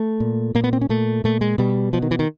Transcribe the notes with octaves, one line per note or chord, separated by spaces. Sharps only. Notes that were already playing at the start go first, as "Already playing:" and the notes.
Already playing: A3
A#2
A#2 A#3
B3
C4
C#4
A#2 A3
A#2 A3
G#3
B2 G3
B2 F3
D#3
E3
D#3